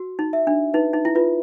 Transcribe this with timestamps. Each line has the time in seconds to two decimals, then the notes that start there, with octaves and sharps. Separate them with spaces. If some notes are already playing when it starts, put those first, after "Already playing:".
Already playing: F#4
0.19 D#4
0.33 E5
0.47 D4
0.74 D#4 B4
0.93 D#4
1.05 E4
1.15 F4 B4